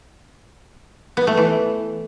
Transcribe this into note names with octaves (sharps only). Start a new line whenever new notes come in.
B3
A3
E3